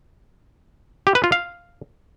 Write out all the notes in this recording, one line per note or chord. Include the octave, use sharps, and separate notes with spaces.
G4
B4
F4
F5